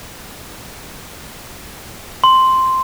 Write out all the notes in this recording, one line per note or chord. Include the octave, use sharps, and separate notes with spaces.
C6